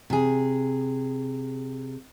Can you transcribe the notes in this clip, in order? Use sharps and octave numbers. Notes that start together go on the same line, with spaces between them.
C3 G#4